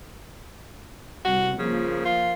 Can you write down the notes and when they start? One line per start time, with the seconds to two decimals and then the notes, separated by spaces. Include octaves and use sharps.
1.25 C2 F#4
1.59 C#3 F3 A#3
2.05 F4